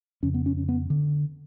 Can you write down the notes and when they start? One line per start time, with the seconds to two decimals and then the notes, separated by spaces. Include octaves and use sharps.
0.23 F2 C#3 C#4
0.34 B3
0.46 C#4
0.57 C#4
0.69 B3
0.90 D3